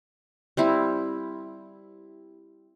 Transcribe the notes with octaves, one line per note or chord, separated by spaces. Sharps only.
G3 C4 E4